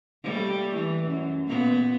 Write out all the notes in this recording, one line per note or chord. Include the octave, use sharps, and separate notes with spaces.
G3 A3 A#3
E3
F#2
A#2 B3